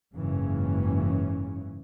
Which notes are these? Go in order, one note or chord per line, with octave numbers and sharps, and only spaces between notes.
F#1 G#2 C#3 E3 C#4